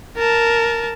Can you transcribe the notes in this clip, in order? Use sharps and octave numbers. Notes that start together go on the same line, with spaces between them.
A#4 A5